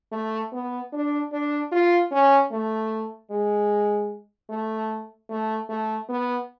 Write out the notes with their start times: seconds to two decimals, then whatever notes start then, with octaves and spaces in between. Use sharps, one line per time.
0.12 A3
0.52 B3
0.92 D4
1.32 D4
1.72 F4
2.12 C#4
2.51 A3
3.31 G#3
4.50 A3
5.30 A3
5.69 A3
6.09 B3